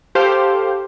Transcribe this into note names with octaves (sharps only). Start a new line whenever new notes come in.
G4 A4 C5 F5